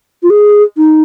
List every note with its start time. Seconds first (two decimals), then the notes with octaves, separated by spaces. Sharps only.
0.23 F4
0.30 G#4
0.77 D#4